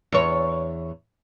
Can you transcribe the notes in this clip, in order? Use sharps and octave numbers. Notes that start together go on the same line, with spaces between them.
E2 C#5